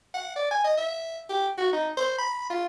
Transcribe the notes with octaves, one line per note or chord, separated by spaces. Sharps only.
F#5
D5
G#5
D#5
E5
G4
F#4
D#4
C5
B5
F4